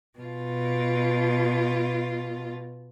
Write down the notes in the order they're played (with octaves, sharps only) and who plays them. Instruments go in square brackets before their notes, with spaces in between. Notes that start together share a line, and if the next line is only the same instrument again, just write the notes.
[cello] B2 F4